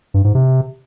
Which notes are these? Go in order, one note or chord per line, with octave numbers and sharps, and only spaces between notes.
G2
G#2
C3